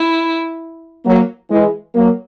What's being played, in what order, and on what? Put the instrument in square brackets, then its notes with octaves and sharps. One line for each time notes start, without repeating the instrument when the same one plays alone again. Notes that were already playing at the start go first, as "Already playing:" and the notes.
Already playing: [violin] E4
[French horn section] F#3 A#3
E3 G#3
F#3 A#3